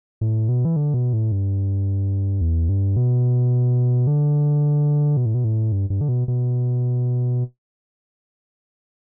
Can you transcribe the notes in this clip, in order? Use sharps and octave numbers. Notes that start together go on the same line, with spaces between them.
A2
B2
E3
D3
B2
A2
G2
E2
G2
B2
D3
B2
A2
B2
A2
G2
G2
D3
B2
B2